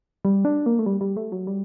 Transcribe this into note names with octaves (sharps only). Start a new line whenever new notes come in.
G3
D4
A#3
A3
G3
G3
A3
F#3
G3